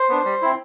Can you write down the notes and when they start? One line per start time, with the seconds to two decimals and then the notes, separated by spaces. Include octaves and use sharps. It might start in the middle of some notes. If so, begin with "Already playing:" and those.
Already playing: C5
0.09 B3 D4
0.25 G3
0.42 C4 E4